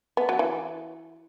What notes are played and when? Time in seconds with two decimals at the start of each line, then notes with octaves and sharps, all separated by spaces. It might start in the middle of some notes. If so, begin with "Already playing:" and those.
0.17 B3
0.29 F#3
0.39 E3